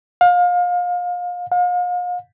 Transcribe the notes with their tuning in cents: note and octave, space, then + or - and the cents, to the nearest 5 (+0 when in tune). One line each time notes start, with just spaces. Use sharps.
F5 +30
F5 +40